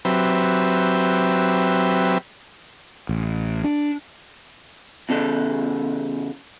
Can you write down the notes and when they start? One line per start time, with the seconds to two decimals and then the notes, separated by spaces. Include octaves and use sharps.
0.05 F#3 C4 G4 B4 E5
3.09 A1
3.64 D4
5.09 E2 C#3 A4